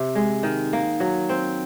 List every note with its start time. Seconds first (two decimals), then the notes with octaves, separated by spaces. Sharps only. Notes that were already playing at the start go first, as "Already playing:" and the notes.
Already playing: C3
0.15 G#3
0.43 D#3
0.73 A#3
1.00 F#3
1.29 C4